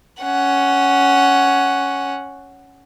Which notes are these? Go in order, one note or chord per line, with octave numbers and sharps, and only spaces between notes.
C#4 F#5